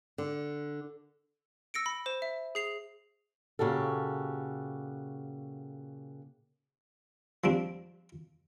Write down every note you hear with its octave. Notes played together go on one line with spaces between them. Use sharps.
D3
E6 A#6 C#7 D7
B5
C5 E7
E5
G#4 C7 F7
A#2 C#3 F#4 G4 A4
F3 G3 C4 D4